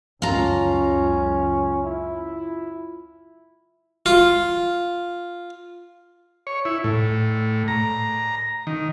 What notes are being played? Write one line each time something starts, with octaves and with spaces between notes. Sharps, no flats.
C#2 F#2 C#4 F4 A#5
E4
F4
C#5
E4
A2
A#5
D#3